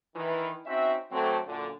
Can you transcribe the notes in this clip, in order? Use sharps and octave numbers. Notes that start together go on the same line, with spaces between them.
D#3 E3
C4 C#4 D#4 F#4 E5
D3 F#3 A3 C4
F#2 A#2 D3